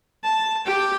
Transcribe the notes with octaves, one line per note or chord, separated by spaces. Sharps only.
A5
G4 G5